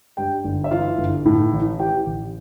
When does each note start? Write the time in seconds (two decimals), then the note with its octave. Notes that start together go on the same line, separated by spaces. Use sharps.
0.17 G2 G4 G5
0.44 G1
0.64 E5
0.71 E3 F4 F5
0.98 G1
1.25 A2
1.53 A1
1.79 E3 G4 G5
2.06 A1